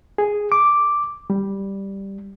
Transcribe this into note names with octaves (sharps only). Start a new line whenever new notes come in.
G#4
D6
G3